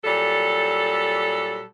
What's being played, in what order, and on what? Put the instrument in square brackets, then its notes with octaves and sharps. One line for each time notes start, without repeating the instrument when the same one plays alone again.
[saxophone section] A#2 F#3 G3 A4